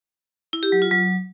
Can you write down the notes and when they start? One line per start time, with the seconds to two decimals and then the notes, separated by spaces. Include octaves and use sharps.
0.53 E4
0.63 G4
0.72 F#3
0.82 F4
0.91 F#3